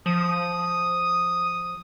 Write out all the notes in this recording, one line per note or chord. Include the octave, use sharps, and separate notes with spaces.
F3 D#6